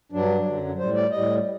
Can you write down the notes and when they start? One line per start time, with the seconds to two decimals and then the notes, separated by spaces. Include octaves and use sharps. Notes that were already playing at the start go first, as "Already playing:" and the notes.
0.12 G2 F#3 D4
0.46 F#2 D3 F#3
0.78 A2 G3 C5
0.96 D5
1.11 A2 G3 D#5